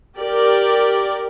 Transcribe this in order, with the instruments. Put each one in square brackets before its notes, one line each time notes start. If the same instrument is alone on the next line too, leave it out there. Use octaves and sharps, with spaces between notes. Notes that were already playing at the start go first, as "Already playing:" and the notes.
[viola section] G4 A#4 D5